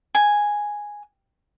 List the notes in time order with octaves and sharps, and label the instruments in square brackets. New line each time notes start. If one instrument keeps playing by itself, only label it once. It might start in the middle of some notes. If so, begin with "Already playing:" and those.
[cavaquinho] G#5